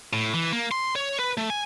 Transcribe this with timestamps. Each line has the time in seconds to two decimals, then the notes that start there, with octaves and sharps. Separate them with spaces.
0.13 A2
0.34 E3
0.53 A#3
0.71 C6
0.96 C#5
1.19 B4
1.38 A3
1.50 G#5